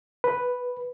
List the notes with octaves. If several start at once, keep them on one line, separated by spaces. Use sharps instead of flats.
B4